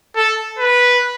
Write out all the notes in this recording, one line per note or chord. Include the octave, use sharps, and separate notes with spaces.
A4
B4